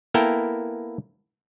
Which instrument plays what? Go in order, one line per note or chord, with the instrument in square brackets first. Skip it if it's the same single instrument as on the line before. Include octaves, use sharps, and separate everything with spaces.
[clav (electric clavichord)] A#3 B3 E4 A4 A#4 G5